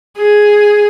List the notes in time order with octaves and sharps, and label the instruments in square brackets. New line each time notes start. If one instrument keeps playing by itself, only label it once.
[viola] G#4